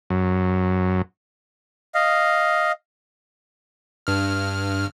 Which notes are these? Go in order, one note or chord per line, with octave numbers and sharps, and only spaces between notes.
F#2
D#5 F5
G2 F6